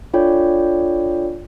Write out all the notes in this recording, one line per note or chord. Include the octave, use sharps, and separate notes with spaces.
D4 F4 A4 C#5 D5 G5